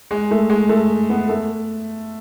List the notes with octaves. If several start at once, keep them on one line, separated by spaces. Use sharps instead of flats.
G#3
A3
G#3
A3
B3
A3